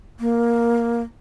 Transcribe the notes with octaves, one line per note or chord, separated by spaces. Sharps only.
A#3